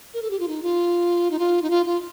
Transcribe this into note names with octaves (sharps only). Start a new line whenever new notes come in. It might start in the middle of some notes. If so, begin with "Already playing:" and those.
A#4
A4
G4
F4
D#4
F4
D#4
F4
D#4
F4
F4